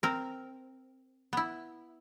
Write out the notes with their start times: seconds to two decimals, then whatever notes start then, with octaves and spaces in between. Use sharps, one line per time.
0.03 C4 A#4
1.33 B3 E4